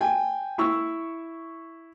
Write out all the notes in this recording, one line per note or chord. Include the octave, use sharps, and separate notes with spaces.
G5 G#5
E4 C#6 E6